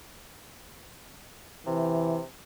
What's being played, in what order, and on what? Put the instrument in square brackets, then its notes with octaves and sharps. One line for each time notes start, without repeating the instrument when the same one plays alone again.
[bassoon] C3 [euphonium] E3